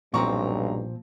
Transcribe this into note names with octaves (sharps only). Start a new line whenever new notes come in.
B1 G2 A#2 F3 C4 A#5 C#6